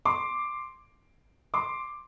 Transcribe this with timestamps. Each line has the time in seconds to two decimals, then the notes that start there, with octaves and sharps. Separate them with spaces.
0.05 C6 D6
1.54 C6 D6